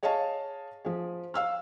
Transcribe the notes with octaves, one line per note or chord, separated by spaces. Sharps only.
G#4 C#5 D#5 F5 A5
F3 G#4
F5 E6 F6